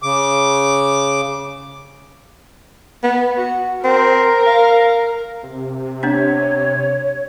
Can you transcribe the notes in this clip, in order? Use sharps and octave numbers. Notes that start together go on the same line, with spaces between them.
C#3 D6
B3
F#4
C4 A#4
F5
C3
B3 C4 D4 C#5